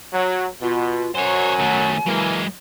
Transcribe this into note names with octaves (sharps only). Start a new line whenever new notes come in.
F#3
B2 F4
F#2 F#3 C5 C#5 G#5
D#3 A3
E3 F#3 G#3 A#3